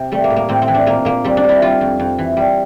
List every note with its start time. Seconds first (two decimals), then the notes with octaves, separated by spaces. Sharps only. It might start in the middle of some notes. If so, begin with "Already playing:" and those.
Already playing: C3
0.12 G3 A3
0.24 A#3
0.30 A2
0.36 A#3
0.49 A2 C4
0.62 C4
0.68 E3
0.74 D4
0.86 A#2 A#3
1.05 A#2 A#3
1.24 G3 C4
1.37 D4
1.44 G3
1.49 E4
1.62 G3 F4
1.81 F2
2.00 F2
2.18 E3
2.37 G3